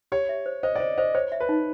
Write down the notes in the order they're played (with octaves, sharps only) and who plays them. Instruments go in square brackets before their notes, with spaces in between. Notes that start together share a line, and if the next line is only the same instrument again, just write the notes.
[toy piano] G4 [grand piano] C#5
[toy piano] E5
C5
[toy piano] C5 [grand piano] D#5
[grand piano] D5
[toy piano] C5 [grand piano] D#5
[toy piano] C5 [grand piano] D#5
[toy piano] C5 [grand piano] C#5
[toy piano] E5
[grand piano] B4
[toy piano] D#4